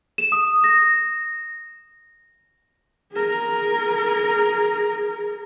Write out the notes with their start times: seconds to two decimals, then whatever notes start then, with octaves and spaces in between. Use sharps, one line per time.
0.18 E7
0.32 D#6
0.64 A#6
3.12 G#4 A#4